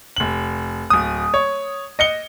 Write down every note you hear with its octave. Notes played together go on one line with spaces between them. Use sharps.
F1 F#7
D1 D#6
C#5
D#5 C#7 G7